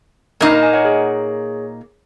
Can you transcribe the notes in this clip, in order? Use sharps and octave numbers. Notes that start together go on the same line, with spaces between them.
A#2 A#3 D#4 A#4 D#5
A#4 D#5
D#5 G#5
C#5 F#5
G#4 C#5